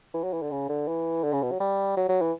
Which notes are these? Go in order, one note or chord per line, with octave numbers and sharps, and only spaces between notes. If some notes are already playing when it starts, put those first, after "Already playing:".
E3
F#3
E3
D3
C#3
D3
E3
D3
C#3
B2
F#3
G3
F#3
F#3
E3